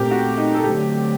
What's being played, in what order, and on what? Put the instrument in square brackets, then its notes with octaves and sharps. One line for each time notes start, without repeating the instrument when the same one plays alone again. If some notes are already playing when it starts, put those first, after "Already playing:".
Already playing: [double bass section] A#2 A3 C4 [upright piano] G4 A#4
[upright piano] F#4
D#4
A4
[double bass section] D3 F#3 A3 C4 [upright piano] G4